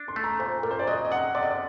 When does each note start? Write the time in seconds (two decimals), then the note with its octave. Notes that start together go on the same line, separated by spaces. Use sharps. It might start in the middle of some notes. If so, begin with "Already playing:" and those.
Already playing: D4
0.08 C6
0.16 A3
0.24 A#5
0.39 A#2 C5
0.63 A#2 A#4
0.71 C5
0.79 D5
0.87 F#3 D#5
1.05 D#5
1.11 C3 F#5
1.35 C3 D5
1.43 D#5
1.51 D5